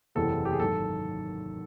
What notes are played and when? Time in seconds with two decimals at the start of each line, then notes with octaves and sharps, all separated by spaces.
0.15 F#1 E2 C3 E3 A4
0.45 G4
0.52 G#4
0.60 G#1 F#2 D#3 A4